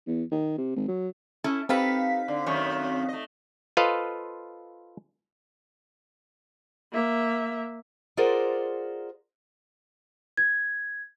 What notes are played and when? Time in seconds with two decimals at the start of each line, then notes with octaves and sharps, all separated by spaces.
0.07 E2
0.32 D#3
0.58 C3
0.76 G#1
0.88 F#3
1.44 C#4 E4 A4
1.69 C4 D#4 G4 A4 B4 F5 B6
2.28 D3
2.46 F#2 D#3 A3 C#5
3.09 A3 D#5
3.77 F4 A4 B4 C5 D#5 F5
6.93 A#3 E5
8.17 F4 G#4 A#4 C5 D5 F#5
10.37 G#6